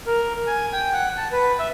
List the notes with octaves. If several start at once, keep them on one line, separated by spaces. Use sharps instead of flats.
A#4
G#5
G5
F#5
A5
B4
E5